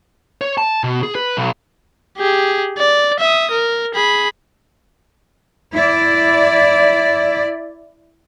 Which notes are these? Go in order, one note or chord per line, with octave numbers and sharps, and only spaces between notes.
C#5
A5
B2
G#4
B4
B1
G4 G#4
D5
E5 D#6
A#4
G#4 B5
E4 D5